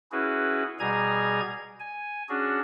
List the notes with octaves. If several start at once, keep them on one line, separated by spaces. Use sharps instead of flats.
C#4 E4 F#4 G#4 B4
B2 G3 G#4 G#5 A#5 G#6
G#5
C#4 D4 F#4 G#4